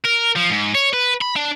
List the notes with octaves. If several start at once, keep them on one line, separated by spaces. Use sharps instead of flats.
A#4
F3
G#2
C#5
B4
B5
D4